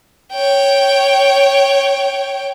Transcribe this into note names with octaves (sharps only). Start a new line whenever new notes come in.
C#5 G5